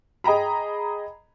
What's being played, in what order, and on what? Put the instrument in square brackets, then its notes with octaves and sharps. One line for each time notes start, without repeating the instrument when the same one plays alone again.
[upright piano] G#4 D#5 G5 A#5 B5